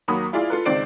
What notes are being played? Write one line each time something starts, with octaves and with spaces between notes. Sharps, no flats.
D#2 F#3 A#3 B5 D#6
E4 F4 G#4 D5 F5
F4 A4 B4
C#2 D#3 C4 D5 C7 D7